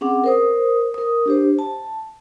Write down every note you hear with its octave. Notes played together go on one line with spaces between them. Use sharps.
C4 C#4 G#4 F#5 D6
A#4 C5 D#6
A#4 D#6
D4 G4 C5
A5